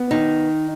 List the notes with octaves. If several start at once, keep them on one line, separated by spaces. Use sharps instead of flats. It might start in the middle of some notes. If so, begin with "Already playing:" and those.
Already playing: B3
D#3 D#4